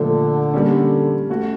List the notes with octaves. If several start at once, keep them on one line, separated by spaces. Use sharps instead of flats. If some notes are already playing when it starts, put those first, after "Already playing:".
Already playing: A#2 D3 F3 A3
G3 A#3 C#4
A3 C#4 F#4